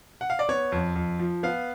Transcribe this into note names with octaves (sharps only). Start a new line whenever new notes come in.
F#5
F5
D5
B3 C#5
F2
F2
F3
B3 F5